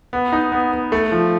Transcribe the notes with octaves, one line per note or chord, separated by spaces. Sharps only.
B3
D#4
B3
B3
A3
F3